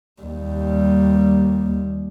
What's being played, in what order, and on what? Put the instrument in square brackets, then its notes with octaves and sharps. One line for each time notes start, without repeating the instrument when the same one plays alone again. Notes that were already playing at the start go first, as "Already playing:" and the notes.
[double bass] D#2 G3